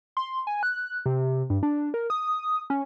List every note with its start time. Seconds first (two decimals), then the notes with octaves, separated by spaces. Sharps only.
0.17 C6
0.47 G#5
0.63 F#6
1.06 C3
1.50 G2
1.63 D4
1.94 A#4
2.10 D#6
2.70 C#4